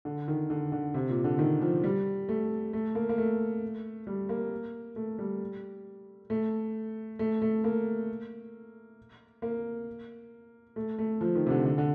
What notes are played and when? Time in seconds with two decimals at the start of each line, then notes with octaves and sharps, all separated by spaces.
0.05 D3
0.28 D#3
0.50 D3
0.72 D3
0.94 C3
1.09 A#2
1.24 D3
1.39 D#3
1.62 F3
1.84 G3
2.29 A3
2.73 A3
2.95 A#3
3.09 A#3
3.18 A3
4.07 G3
4.29 A#3
4.96 A3
5.19 G3
6.30 A3
7.19 A3
7.42 A3
7.64 A#3
9.42 A#3
10.76 A3
10.98 A3
11.21 F3
11.35 D#3
11.47 C3
11.51 D3
11.66 D3
11.78 D3